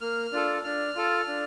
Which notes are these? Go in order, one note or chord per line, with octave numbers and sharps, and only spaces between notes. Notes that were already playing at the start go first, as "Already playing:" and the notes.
A#3 F6
D4 F4 A4
D4 F6
F4 A4
D4